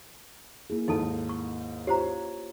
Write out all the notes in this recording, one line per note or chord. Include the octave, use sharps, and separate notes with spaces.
A#3 E4 G#4
D#2 G#2 D#4 A4 A5
C#6
F4 G4 C5 C#5 A#5